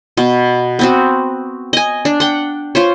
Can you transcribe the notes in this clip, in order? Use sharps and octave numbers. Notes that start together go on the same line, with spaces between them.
B2
B3 C4 F#4
D#5 G#5
D4
F#5 G5
F4 C5 C#5